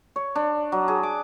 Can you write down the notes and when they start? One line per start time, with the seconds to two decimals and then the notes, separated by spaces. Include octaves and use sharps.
0.16 C#5
0.35 D4
0.72 F#3
0.88 G#4
1.03 D6